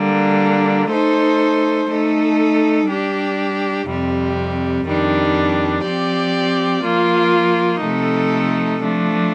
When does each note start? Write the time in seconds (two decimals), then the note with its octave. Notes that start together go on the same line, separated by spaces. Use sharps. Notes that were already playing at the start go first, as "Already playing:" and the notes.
Already playing: D3 G3 A#3 D4
0.90 A3 D#4 A4 C5
1.89 A3 D#4 A4
2.87 G3 D4 G4
3.87 F2 C3 G3
4.85 F2 D#3 G3 D4
5.84 F3 C4 G4 D5
6.83 F3 A#3 F4
7.81 C3 F3 A3 D#4 A4
8.80 F3 A3 D4